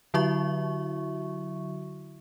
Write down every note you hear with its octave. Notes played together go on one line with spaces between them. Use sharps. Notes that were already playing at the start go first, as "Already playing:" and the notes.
D3 F#3 E4 F#4 E5 C#6